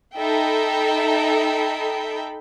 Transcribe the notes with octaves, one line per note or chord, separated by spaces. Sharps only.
D#4 A4 E5 G5 B5